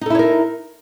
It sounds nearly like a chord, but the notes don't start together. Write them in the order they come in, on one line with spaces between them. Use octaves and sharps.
D#4 A4 E4 C#5 A#4